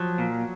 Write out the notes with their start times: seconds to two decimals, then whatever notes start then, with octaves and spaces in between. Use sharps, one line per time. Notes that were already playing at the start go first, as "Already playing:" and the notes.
Already playing: F3 F#3
0.18 A#2